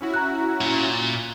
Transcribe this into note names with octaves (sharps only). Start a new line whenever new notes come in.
C#4 E4 F#4
A#5 F#6
A#2